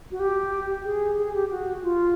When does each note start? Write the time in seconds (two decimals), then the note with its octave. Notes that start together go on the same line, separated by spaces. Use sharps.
0.12 F#4
0.20 G4
0.85 G#4
1.18 G#4
1.34 G4
1.50 F#4
1.83 F4